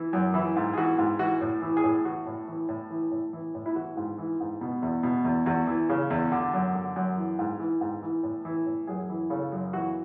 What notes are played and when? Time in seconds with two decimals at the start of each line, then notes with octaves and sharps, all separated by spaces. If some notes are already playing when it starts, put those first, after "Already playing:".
Already playing: E3
0.13 F#2
0.34 E3 E4
0.56 G#2
0.73 G#4
0.77 E3 F#4
0.98 G#2
1.19 E3 F#4
1.41 A2
1.62 E3
1.77 G#4
1.84 A2
2.05 E3 F#4
2.26 A2
2.48 E3
2.69 A2
2.91 E3
3.11 A2
3.33 E3
3.55 A2
3.66 E4
3.76 E3 F#4
3.97 G#2
4.18 E3
4.40 G#2
4.61 B2
4.82 E2
5.03 B2
5.25 E2
5.46 E2 F#4
5.67 E3
5.89 C#3
6.10 E2
6.32 D3
6.53 F#2
6.75 D3
6.96 F#2
7.17 E3
7.39 G#2
7.60 E3
7.81 G#2
8.03 E3
8.23 A2
8.45 E3
8.66 A2
8.87 F#2 G#4
9.09 E3
9.30 C#3 A4
9.52 F#2
9.73 E3 F#4